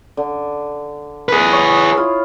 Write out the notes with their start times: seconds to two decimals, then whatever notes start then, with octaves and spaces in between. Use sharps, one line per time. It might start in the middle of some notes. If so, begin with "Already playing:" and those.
0.17 D3
1.29 G#4 B4
1.52 C#5 D#5
1.97 E4 F4